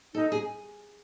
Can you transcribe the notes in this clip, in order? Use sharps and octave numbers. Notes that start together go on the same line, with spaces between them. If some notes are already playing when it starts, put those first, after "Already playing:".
D#4 A4
G#4